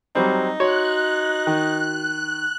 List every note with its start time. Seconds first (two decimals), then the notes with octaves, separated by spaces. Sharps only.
0.15 F#3 G3 C4 D#4
0.60 F#4 C#5 C6 F#6
1.47 D#3